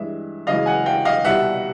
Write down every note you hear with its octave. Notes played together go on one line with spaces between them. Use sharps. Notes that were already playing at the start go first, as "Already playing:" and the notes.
Already playing: G2 E3 G#3 E5
F#2 C#3 E3 G#3 D#5 F5
F#5 G#5
F5 G5
D#5 F5
C2 B2 G3 E5 F#5